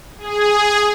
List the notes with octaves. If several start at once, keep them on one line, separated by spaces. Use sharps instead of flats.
G#4